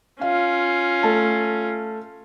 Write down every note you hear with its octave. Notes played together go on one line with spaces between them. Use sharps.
C#4 F4 F5
A3 A5